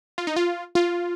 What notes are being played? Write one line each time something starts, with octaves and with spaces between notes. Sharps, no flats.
F4
D#4
F4
F4